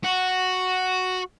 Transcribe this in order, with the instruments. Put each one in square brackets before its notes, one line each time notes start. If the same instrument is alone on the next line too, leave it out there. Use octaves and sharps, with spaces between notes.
[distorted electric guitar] F#4